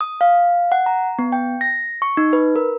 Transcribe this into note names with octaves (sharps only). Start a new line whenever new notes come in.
D#6
F5
F#5
A#5
B3
G5
A#6
C#6
D#4
B4
A#4